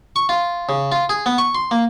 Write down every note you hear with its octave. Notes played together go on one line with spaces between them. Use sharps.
C#6
F4
C#3
F4
G#4
B3
C#6
C6
A#3